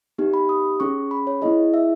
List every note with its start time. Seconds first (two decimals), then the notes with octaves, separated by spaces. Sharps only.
0.18 B3 D#4 G4
0.34 B5
0.49 D#6
0.80 C#4 G#4 C#6
1.11 B5
1.27 C#5
1.42 B3 E4 G#4 D#5
1.74 E5